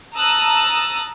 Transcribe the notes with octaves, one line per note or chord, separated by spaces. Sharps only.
A5 A#5 D#6 E6 F#6